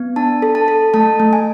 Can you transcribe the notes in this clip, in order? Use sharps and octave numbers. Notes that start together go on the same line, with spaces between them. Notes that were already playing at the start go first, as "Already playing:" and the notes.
Already playing: B3
D4 A5
A4
A5
A4
A3 A5
A3
G#5